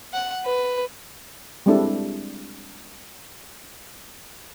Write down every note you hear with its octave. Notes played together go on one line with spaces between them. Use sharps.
F#5
B4
G3 G#3 C4 D4 E4 A4